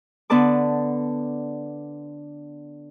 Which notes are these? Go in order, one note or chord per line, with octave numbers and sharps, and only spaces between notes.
D3 B3 B4 A5 D6